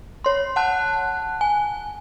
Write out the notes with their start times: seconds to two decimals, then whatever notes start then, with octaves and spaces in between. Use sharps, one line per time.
0.24 C#5 C6
0.56 F#5 A5 F#6
1.41 G#5